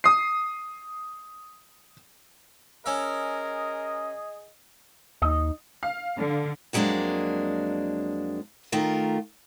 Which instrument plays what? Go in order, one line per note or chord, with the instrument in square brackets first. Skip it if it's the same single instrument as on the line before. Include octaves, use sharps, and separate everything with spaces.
[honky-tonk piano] D#6 C7
[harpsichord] C#4 E5 [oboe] G#4 [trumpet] A#4 [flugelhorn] D#5
[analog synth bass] D#2 [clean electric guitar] D#4 D#5
[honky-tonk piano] F5
[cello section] D3
[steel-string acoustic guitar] F2 F#3 G#3 A#3 D4
D#3 A3 F4 A#4